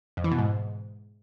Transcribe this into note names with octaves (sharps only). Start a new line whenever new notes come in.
F2
E3
B2
G#2